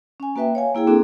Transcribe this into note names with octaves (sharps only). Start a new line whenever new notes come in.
C#4 G#5
A#3 F#4 B4 E5 G5
C#5 F5 G#5
A#3 E4 G#4 G5
A#3 C4 D4 F#4 G#4 A4